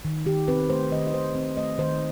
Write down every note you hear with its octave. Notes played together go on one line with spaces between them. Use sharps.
D#3
D#3 G4
C4 B4
A3 C5
D#3 D#5
D#5
D#3 C5
C4
A3 D#5
D#3 C5